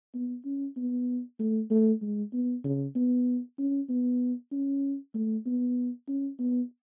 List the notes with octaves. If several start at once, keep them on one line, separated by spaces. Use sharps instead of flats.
B3
C#4
B3
A3
A3
G#3
B3
C#3
B3
C#4
B3
C#4
A3
B3
C#4
B3